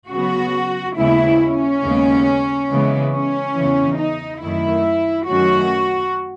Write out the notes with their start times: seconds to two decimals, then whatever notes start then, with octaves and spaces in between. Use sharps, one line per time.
0.10 C#3 F#3 B3 F#4
0.97 D#2 C#3 G#3 B3 E4
1.41 C#4
1.83 D#2 C#3 G#3 B3
2.70 C#3 E3 G#3 B3
3.13 C#4
3.55 E2 C#3 E3
3.98 D#4
4.41 F#2 D#3 A3 E4
5.28 F#2 D#3 F#3 A3 C#4 F#4